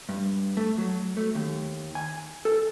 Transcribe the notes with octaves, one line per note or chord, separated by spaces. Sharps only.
G2
A3
F#3
A3
D#2
G#5
A4